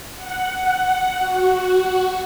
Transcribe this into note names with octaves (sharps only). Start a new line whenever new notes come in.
F#5
F#4